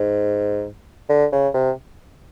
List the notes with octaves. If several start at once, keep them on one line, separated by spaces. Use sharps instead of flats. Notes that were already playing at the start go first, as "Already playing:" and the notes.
Already playing: G#2
D3
C#3
C3